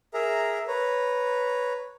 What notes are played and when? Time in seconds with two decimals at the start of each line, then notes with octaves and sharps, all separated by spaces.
0.14 G#4 A#4 E5 A#5
0.68 B4 C#5 A#5